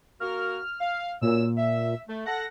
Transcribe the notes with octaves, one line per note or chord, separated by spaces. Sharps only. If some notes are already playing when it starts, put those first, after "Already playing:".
A#3 F#4 A#4 F6
F5
F#2 A#2 E6
E5
A3
A4 F#5 A#6